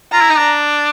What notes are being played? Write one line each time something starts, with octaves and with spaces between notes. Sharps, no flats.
F4 A#5
E4
D#4
D4